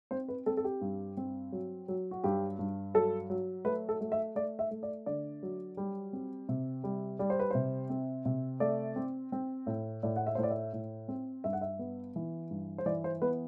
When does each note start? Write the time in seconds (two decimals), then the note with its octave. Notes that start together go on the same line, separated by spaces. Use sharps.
0.11 C4 C5
0.28 B4
0.46 C4 A4
0.57 A4
0.64 G4
0.81 G2
1.17 C4
1.52 F#3
1.88 F#3
2.11 F#4
2.24 G2 G4
2.59 G2
2.94 F#3 A4
3.30 F#3
3.65 A3 B4
3.89 A4
4.01 A3
4.12 E5
4.35 A3 D5
4.59 E5
4.71 A3
4.83 D5
5.06 D3 D5
5.43 F#3
5.77 G3
6.13 C4
6.49 C3
6.84 G3
7.19 G3 D5
7.30 C5
7.40 B4
7.51 C3 C5
7.90 C4
8.25 C3
8.60 A3 D5
8.96 C4
9.32 C4
9.67 A2
10.03 A2 D5
10.16 F#5
10.27 E5
10.35 C5
10.38 A2
10.43 D5
10.50 E5
10.73 A2
11.08 C4
11.44 G2 E5
11.53 F#5
11.61 E5
11.79 B3
12.16 E3
12.51 G2
12.78 C5
12.86 E3 D5
13.04 C5
13.22 B3 B4